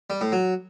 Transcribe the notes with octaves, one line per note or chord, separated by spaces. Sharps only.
G3
A2
F#3